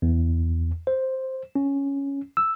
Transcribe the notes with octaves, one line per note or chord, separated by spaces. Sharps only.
E2
C5
C#4
E6